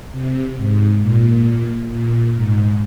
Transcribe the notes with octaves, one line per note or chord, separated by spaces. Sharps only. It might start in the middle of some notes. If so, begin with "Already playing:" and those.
C3
G#2
A#2
A#2
G#2